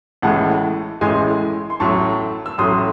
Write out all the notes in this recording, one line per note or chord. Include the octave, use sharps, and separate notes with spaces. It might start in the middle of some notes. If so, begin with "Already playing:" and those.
A1 A2 E3 G#3 F#5 A5
A1 A2 E3 G#3 G#5 C6
C6
A1 A2 F#3 A3 A5 C#6
E6
A1 A2 F#3 A3 C6 D#6